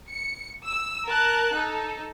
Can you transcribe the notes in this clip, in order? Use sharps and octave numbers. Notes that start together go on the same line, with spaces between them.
C#7
E6
A#4 A5 F#6
D#4 A4